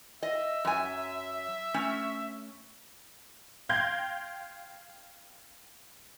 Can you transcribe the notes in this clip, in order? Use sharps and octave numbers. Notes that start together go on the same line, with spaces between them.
D#5 E5
F#2 G#5
A3 C#4
F5 G5 C6 G6 G#6 A#6